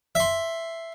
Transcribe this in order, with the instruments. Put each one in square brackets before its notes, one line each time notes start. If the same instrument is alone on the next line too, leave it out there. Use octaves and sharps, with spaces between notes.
[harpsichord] E5 C6